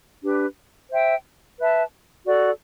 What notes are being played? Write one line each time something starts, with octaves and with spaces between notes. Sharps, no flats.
D4 G4 B4
C5 E5 G5
B4 E5 A5
F#4 A4 D5